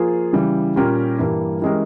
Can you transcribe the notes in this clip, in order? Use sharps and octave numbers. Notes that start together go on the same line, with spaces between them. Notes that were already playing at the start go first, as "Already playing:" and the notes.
Already playing: F3 A#3 F4 G#4
C#3 E3 G3
A#2 G3 C#4 G4 A#4
G2 E3 G3 A#3
E3 G#3 C#4 G4 A#4